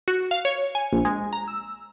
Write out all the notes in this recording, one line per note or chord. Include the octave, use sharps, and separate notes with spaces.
F#4
F5
C#5
G#5
A#1
G#3
A#5
E6